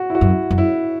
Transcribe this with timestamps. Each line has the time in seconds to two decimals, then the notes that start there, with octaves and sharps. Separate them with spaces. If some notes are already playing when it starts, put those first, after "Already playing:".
Already playing: F#4
0.10 E4
0.15 F#4
0.21 F#2
0.51 F#2
0.58 E4